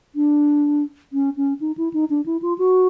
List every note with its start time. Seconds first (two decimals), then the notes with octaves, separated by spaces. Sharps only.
0.15 D4
1.13 C#4
1.37 C#4
1.61 D#4
1.78 E4
1.94 D#4
2.10 D4
2.26 E4
2.42 F4
2.58 F#4